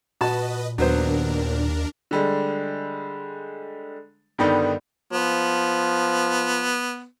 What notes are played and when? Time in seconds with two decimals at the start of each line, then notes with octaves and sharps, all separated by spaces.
0.21 A#2 F#4 B4 D#5 A5
0.78 D#2 F#3 B3 D4 A#4 C5
2.11 D3 G3 G#3
4.38 G2 D3 D#3 G3 B3 D#4
5.12 F3 B3